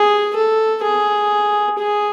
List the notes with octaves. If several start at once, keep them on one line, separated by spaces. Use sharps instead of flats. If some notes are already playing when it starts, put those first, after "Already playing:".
Already playing: G#4
A4
G#4
G#4